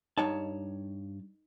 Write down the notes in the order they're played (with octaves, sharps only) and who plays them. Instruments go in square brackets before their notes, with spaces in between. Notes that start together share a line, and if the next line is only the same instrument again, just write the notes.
[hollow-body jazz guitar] G2 C#5 A5 [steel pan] D#4